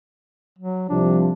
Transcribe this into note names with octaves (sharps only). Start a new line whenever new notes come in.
F#3
C2 C3 F3 D4